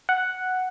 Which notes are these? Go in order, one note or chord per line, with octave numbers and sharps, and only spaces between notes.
F#5